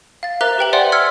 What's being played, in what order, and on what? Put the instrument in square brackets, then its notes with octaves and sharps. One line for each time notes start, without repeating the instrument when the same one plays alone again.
[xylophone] F5 A6
A#4 C5 E5 A#5 D6 F#6
G4 B4 G5 F#7
C5 D5 E5 F#5 G#5 C6
C6 E6 F6 G#6 B6 C#7